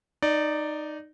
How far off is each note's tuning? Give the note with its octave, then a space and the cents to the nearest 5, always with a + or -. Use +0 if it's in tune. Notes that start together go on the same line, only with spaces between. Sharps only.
D#4 -15 D5 +0